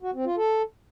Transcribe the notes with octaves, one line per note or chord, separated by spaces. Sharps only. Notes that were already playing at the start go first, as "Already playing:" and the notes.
F#4
C4
F4
A4